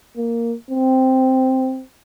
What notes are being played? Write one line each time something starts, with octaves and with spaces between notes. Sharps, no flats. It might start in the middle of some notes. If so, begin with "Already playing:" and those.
A#3
C4